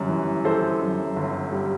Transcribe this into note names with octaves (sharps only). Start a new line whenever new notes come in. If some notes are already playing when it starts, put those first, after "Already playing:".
Already playing: G1 F#2 G3
E3
E3 A4 C5
F#2
G1
G3